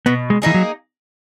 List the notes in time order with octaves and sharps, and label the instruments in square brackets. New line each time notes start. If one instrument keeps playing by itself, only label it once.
[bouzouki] B2 [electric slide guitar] B3
[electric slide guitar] G#3
[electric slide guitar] E3 [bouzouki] A#3 D#4 G#4
[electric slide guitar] F#3